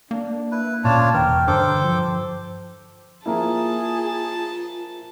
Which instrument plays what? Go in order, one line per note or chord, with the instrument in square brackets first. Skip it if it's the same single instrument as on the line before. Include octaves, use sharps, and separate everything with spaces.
[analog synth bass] A#3 [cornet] D4
[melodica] E4 B4
[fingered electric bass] D1 A#2 C#4 [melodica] D4 F4 C#5 [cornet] A5
[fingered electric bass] E1 [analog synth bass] E3 [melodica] A#4 [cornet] G5
[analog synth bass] G2 [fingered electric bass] D3 [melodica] A4 G5 D6 [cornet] C5
[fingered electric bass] F3
[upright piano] F3 A#3 E4 [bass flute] F4 [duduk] G#4 [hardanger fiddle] A5